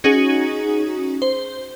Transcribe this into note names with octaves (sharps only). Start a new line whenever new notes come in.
C#4 D#4 F#4 G#4
C5